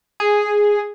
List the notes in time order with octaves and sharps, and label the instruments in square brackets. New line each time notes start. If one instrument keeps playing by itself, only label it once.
[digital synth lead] G#4